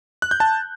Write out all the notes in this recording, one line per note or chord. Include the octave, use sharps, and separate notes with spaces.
F#6
G6
A5